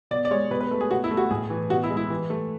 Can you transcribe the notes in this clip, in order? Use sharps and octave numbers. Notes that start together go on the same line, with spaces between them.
B2 D5
D5
G#3 C#5
B2 B4
B4
A3
G#4
B2 F#4
E4
A3
F#4
A2 G#4
E3
B2 F#4
E4
G#3
E4
E3
A3